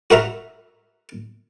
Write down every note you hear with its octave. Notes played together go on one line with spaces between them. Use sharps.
F#4 A#4 E5 A#5